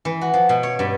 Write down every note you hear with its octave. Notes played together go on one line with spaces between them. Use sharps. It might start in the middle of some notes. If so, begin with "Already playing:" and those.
E3
F#4
F3
B2
C#5
G2